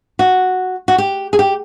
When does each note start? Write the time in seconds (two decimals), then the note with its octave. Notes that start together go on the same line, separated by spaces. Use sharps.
0.19 F#4
0.88 F#4
0.98 G4
1.33 G#4
1.39 G4